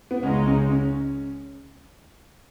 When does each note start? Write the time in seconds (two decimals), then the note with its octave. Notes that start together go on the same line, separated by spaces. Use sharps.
0.11 B3
0.23 C#2 C#3 G#3 C#4 D#4
0.46 C#4
0.71 C#4